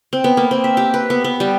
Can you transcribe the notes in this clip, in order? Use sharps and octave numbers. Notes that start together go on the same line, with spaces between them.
C4
B3
A#3
C4
E5
G4
B4
B3
B3
G3